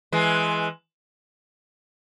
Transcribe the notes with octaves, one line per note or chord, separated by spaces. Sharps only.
E3 G#3